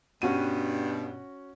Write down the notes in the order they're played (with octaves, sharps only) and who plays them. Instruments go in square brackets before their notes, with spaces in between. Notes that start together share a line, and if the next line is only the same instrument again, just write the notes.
[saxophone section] G2 B2 [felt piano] C#4 F#4 D#7